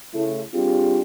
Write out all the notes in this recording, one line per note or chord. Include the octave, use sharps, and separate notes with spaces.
C#3 A3 E4
G3 C4 D4 F4 G4 G#4